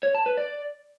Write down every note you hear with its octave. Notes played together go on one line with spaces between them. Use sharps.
C#5
A5
B4
D5